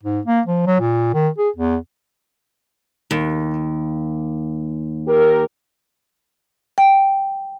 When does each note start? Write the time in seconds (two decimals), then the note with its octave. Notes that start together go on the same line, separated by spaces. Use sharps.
0.03 G#2
0.25 A#3
0.46 F3
0.67 F#3
0.80 A#2
1.14 D#3
1.38 G#4
1.56 E2
3.11 D#2
5.08 G4 A#4
6.78 G5